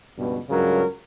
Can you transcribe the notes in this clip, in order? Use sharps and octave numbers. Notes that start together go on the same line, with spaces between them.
C#2 G2 B2
C#2 G2 C#3 F#3 A#4